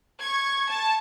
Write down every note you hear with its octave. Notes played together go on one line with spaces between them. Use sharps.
C#6 G#6
A5